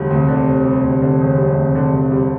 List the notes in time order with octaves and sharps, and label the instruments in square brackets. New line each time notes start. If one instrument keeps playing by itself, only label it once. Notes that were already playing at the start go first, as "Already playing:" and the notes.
Already playing: [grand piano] E1 D2 D3 G3
[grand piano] D2 [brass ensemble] C3
[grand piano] D3
E1
G3
D2
D3
E1
G3
[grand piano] D2 [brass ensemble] C3
[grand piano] D3
E1
G3